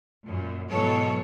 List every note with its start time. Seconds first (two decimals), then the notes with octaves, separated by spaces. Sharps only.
0.23 F#2 A#2
0.69 G#2 B2 E3 F#3 A4 C#5